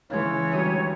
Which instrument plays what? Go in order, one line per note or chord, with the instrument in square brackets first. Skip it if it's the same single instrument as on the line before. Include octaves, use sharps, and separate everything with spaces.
[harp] C#3 G#3 [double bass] E3 [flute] C#5
[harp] D2 G3 D#6